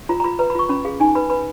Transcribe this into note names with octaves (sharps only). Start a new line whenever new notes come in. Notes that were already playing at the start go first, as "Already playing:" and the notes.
F4 A#5
A#5
F4 B5
B4 A#5
B5
F4 C#6
C#4 B5
G#4 F5
D#4 G#5
B4 B5
B4 B5